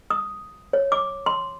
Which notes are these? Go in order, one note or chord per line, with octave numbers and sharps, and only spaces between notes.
D#6
C#5
D6
C6